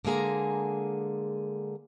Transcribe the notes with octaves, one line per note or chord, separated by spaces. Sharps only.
D3 G#3 A#3 G#4 A#5